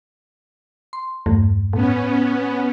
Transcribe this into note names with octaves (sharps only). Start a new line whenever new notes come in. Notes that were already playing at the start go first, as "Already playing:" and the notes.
C6
E2 G2 A3
A2 B3 C#4